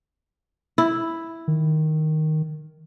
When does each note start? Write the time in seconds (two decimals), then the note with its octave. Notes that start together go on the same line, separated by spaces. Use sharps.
0.78 E4
1.48 D#3